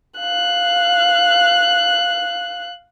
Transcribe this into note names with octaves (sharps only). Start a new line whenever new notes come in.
F5 F#6